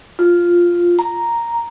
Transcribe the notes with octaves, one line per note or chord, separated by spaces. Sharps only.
F4
A#5